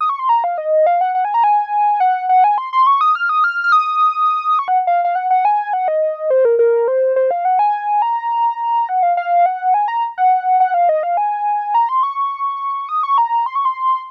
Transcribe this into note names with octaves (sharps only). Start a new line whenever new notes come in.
D#6
C#6
C6
A#5
F5
D#5
F5
F#5
F#5
G#5
A#5
G#5
F#5
F#5
G#5
C6
C6
C#6
D#6
F6
D#6
F6
F6
D#6
C#6
F#5
F5
F5
F#5
F#5
G#5
F#5
D#5
C5
A#4
A#4
C5
C5
F5
F#5
G#5
A#5
F#5
F5
F5
F#5
G#5
A#5
F#5
F#5
F5
D#5
F5
G#5
A#5
C6
C#6
D#6
C#6
A#5
C6
C#6
C6